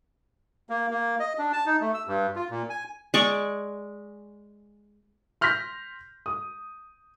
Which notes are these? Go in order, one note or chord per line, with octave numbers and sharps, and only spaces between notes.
A#3
A#3
D#5
D4
A5
D#4
A3
E6
G2
F4
A#2
G#5
G#3 D5 C#6
C6 F6 G6 A#6 B6
D#6